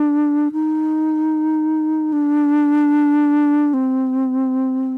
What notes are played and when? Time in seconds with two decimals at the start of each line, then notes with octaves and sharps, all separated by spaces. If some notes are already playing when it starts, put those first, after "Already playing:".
Already playing: D4
0.52 D#4
2.13 D4
3.74 C4